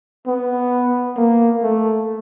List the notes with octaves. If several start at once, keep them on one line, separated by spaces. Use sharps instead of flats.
B3
A#3
A3